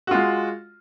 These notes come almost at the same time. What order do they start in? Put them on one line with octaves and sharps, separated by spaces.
F#4 F4 G#3